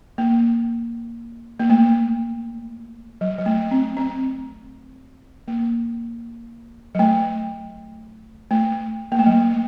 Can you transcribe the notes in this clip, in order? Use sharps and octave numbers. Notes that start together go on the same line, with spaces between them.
A#3
A#3
A3
F#3
F#3
A3
C4
C4
A#3
F#3
A3
A3
A#3
A3
F#3
A3